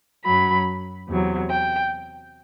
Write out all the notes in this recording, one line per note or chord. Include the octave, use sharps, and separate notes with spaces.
F#2 F#3 B5
E2 C3 F#3
G5